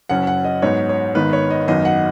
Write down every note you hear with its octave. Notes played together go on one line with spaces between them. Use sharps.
F#1 F#2 F#3 C#4 F#5
F#5
D#5
G#2 F#3 B3 D#4 C#5
C#5
G#1 G#2 D#3 B3 D#4 B4
C#5
D#5
G#1 F#2 F#3 B3 D#4 D#5
F#5